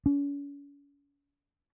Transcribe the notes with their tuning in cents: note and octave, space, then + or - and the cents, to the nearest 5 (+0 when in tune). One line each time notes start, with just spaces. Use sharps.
C#4 +40